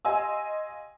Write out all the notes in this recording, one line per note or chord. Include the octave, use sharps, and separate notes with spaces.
G4 D#5 F5 G#5 C6 E6